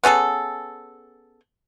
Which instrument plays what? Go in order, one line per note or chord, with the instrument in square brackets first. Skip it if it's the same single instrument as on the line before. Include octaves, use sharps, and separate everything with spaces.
[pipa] B3 C#4 G#4 A4